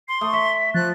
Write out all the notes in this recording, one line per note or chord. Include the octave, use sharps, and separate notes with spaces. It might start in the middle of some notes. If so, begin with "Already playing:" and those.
C6 C7
A3 D#6
E5 C#6 B6
F3 F#6 A6